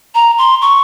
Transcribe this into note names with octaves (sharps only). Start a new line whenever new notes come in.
A#5
C6
C#6